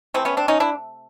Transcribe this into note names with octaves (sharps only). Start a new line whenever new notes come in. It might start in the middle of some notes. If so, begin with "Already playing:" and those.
C3 E3 A3 C4
B3 C#4
C4 D4
C#4 D#4
D4 E4